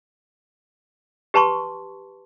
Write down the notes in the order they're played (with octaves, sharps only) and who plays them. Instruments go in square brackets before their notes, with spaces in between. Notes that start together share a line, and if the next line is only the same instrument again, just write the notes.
[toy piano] G4 B4 A5 C6 C#6